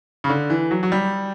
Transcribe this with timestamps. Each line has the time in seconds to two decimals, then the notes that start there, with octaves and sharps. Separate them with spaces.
0.24 C#3
0.30 D3
0.50 E3
0.71 F#3
0.83 F#3
0.92 G3